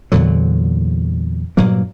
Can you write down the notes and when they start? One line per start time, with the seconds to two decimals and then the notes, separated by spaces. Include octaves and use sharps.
0.12 E2 A#2 D3 F#3
1.57 G2 A#2 F#3 A#3